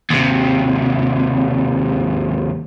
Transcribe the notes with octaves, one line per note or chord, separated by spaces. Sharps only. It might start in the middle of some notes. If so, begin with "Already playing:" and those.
D#2 C3